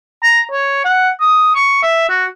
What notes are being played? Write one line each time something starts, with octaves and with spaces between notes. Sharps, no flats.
A#5
C#5
F#5
D#6
C#6
E5
F#4